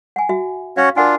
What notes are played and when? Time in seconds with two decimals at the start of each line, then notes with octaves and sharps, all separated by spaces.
0.16 F#5 G#5
0.29 F#4 E5
0.77 C#4 F#4 C#5 F5
0.96 D4 F4 A#4 F#5 G#5